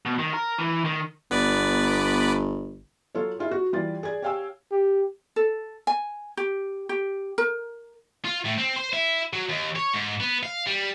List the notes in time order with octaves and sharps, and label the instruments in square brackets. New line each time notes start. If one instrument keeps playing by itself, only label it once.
[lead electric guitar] B2
D#3
A#4
E3
D#3
[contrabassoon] G1 [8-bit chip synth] B3 B4 D5
[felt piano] F#3 F4 A4 C#5
E4 F4 G#4
F#4
E3 G3 F4 G4 D5 A6
G#4 D5 G#6
G4 C#5 F5 G5 G#5 E6
[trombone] G4
[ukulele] A4
G#5
G4
G4
A#4
[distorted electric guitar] F4
A2
C4
C5
E4
F#3
D#2
C#5
G#2
B3
F5
G3